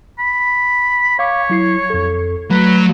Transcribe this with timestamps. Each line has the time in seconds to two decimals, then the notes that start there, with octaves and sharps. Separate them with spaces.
0.19 B5
1.19 C#5 F5 D6
1.50 F#3 E4 C7
1.90 F2 A4
2.51 F#3 A3 B4